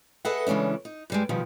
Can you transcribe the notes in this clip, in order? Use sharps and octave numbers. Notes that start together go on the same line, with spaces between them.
G#4 A4 B4 D#5 E5 F#5
C#3 E3 G#3 C#4 D4
D#4
G2 G3 G#3
B2 D#3 F3 G3 G#3